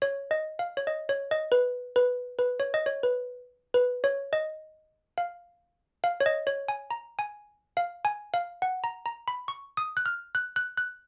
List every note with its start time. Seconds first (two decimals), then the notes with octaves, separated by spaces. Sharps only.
0.02 C#5
0.31 D#5
0.59 F5
0.77 C#5
0.87 D#5
1.09 C#5
1.31 D#5
1.52 B4
1.96 B4
2.39 B4
2.60 C#5
2.74 D#5
2.86 C#5
3.03 B4
3.74 B4
4.04 C#5
4.33 D#5
5.18 F5
6.04 F5
6.20 C#5
6.26 D#5
6.47 C#5
6.68 G#5
6.91 A#5
7.19 G#5
7.77 F5
8.05 G#5
8.34 F5
8.62 F#5
8.84 A#5
9.06 A#5
9.28 B5
9.48 C#6
9.77 D#6
9.97 F#6
10.06 F6
10.35 F#6
10.56 F#6
10.77 F#6